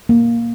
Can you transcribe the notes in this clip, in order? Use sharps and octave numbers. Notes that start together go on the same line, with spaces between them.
A#3